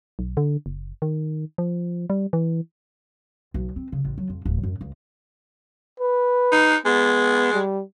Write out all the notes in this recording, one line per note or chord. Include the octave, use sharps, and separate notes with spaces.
B1
D3
F#1
D#3
F3
G3
E3
B1
C4
C#3
A1
F#3
F2
D1
F#2
C#2
B4
D#4
G#3 B3
G3